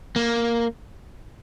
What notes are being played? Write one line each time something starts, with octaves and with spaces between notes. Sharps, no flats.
A#3